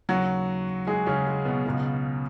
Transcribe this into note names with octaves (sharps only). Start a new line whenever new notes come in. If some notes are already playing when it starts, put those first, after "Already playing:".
D#2 C#3 F#3 F#4
G#3 G#4
C#3 C#4
G#3
B2 B3
C#2 C#3 F#3